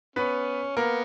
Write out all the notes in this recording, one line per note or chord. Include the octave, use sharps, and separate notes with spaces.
B3 C#4 B4
A#3 B3 A#4